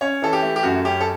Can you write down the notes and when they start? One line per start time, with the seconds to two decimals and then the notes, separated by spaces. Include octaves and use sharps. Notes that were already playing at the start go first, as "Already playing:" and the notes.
0.01 C#4 C#5
0.22 E3 A4
0.33 G4
0.42 A3
0.56 G4
0.63 F#2 F#4
0.85 C#4 G4
1.01 A4